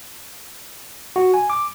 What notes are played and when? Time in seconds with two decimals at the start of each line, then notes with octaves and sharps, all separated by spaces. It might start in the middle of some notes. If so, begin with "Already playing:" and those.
1.16 F#4
1.34 G#5
1.50 D6